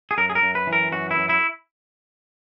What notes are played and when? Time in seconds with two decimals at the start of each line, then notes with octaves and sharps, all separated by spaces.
0.11 G#4
0.18 F#2 A#4
0.30 G#4
0.35 A#4
0.42 F#2
0.55 B4
0.67 E3
0.73 A#4
0.92 F#2 F#4
1.11 E4
1.17 F#2
1.29 E4